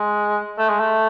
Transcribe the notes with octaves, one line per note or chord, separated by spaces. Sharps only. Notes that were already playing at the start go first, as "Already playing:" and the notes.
Already playing: G#3
A3
G#3
A3